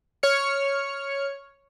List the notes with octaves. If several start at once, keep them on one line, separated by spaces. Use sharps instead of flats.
C#5 F6 C#7